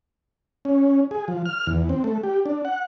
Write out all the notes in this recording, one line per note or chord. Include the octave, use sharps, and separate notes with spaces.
C#4
G#4
F3
F6
E2
C4
A3
G4
D4
F#5